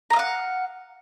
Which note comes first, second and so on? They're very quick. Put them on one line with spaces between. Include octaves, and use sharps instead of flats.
A#5 D#5 F5 F#5